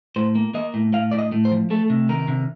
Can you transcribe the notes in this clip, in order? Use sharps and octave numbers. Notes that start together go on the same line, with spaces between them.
A2 C5
A#3
A#3 D#5
A2
A2 F5
A2 D5
D#5
A2
C5
F3
A3 A4
C3
D#3 A#4
C3